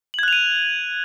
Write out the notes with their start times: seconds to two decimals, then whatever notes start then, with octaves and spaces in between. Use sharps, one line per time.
0.14 F#7
0.19 G#6
0.23 F#6
0.28 F7
0.33 D#7